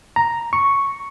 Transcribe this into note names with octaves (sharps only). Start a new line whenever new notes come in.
A#5
C#6